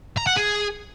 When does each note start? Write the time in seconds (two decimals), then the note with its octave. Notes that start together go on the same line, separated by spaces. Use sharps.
0.17 A#5
0.27 F#5
0.36 G#4